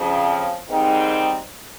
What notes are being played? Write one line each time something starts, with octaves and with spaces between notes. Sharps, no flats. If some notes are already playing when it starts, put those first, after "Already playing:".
Already playing: F2 C#3 F3
G#2 D#3 G3 C4 D#4